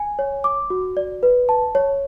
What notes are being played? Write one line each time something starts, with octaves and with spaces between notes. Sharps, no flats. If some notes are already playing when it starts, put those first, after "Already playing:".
Already playing: G#5
C#5
D6
F#4
D5
B4
A5
C#5